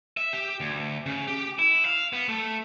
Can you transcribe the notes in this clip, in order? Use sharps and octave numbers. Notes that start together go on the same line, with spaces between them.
E5
G4
D2
C#3
G4
E4
F5
B3
A3